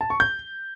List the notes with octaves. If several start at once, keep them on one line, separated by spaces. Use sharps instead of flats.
A5
C#6
G6